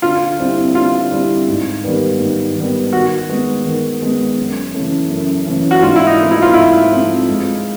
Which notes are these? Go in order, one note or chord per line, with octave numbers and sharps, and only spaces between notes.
D3 F4
G3 C4 E4
D3 F4
G3 C4 E4
G#2
D#3 G3 B3
G#2
D#3 G3 B3
D#3 F#4
G#3 B3
D#3
G#3 B3
F#2
C#3 E3 A3 C#4
F#2
C#3 E3 A3 C#4
F#4
G#2 F4
E4
D#4
F3 A3 C4
E4
F4
G#2 E4
F3 A3 C4
G#3